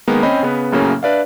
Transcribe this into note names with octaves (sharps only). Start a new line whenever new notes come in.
D#3 G#3 A#3 B3
C4 C#4 C5 D#5 G5 B5
C#3 B3 B4
F#2 A2 C#3 F#3 A#3 C#4
D4 B4 D5 E5 F5